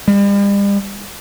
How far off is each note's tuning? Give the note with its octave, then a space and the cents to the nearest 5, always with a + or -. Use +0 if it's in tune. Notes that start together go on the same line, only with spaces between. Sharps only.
G3 +40